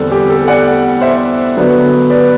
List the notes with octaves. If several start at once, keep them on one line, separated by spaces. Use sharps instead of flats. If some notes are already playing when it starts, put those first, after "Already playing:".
Already playing: E2 D3 G3 C4 A4
G4
A4
D5 F#5
C5 E5
D3 F#3 B3 D4
B4 D5